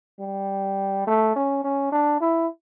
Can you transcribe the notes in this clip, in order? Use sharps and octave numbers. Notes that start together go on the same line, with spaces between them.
G3
A3
C#4
C#4
D4
E4